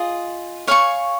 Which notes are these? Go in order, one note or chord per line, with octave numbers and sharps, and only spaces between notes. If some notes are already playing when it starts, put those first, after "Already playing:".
Already playing: F4 G#4 D#5
C#5 F5 G#5 C#6